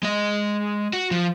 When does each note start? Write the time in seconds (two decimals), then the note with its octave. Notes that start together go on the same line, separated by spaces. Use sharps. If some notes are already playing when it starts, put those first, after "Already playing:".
0.03 G#3 D#5
0.93 F#4
1.11 F3